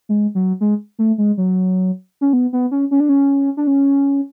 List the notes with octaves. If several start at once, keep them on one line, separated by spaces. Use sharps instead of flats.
G#3
F#3
G#3
A3
G#3
F#3
C#4
B3
B3
C#4
C#4
D4
C#4
D4
C#4